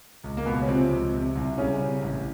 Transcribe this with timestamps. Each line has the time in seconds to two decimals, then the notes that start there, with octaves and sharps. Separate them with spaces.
0.24 C#2
0.37 A#3
0.46 C#2 B2 B3
0.62 C#4
0.68 C3 F3 C4
0.91 C#2
1.13 C3
1.35 C2
1.58 C2 C#3 C#4
1.80 C3
2.02 A1